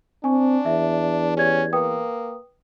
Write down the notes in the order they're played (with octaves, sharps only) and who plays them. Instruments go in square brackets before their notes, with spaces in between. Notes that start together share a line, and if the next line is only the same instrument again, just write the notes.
[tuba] C4 [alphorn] D4 [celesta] G#5 C#6
[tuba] E2 [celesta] E5
[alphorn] C#4 [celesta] G4 D5 G#6
[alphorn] A#3 [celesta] B4 G5 D#6